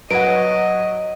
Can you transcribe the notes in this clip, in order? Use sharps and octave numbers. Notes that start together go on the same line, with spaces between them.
F#3 B4 D#5 F#5 D7